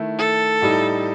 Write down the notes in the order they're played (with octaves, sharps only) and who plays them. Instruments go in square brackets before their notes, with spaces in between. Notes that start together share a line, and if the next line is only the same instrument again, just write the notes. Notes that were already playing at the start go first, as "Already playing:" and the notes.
Already playing: [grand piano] D#3 A3 E4
[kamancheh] A4
[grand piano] A2 G3 D#4